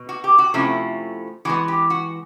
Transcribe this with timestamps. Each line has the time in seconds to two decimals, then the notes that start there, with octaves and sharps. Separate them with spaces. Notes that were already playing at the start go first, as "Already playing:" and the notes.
Already playing: B2
0.09 F#4
0.24 G4
0.38 F#4
0.54 C3 F3 A3 C#4 E4
1.45 E3 G#3 B3 F#4
1.68 G4
1.90 F#4